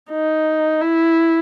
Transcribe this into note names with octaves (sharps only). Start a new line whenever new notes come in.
D#4
E4